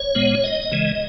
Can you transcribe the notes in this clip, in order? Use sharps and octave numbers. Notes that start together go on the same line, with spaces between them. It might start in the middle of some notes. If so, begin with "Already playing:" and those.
Already playing: C#5
A#2 G#3 B3
D#5
C#3 E3 G#3